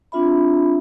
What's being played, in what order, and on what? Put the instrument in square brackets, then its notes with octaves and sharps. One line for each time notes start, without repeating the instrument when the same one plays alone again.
[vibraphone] C4 D4 F4 E5 B5